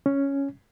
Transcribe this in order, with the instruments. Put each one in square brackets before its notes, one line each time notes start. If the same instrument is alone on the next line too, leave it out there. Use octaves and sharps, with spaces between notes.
[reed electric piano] C#4